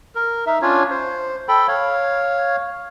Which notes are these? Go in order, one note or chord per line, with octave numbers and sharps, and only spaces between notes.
A#4
D#4 E5
C#4 D4 F4 C#5
C5
A4 G5 B5
C#5 F5